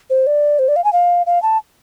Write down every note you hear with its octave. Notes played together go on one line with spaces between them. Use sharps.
C5
D5
C5
D5
F5
G#5
F5
F5
A5